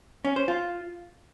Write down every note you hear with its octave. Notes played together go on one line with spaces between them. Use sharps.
C#4
C5
F4